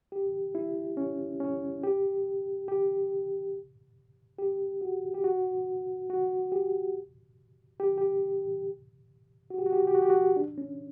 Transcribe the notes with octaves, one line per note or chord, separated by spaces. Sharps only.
G4
E4
C#4
C#4
G4
G4
G4
F#4
G4
F#4
F#4
G4
G4
G4
F#4
G4
F#4
G4
F#4
G4
F#4
G4
F#4
D4
C#4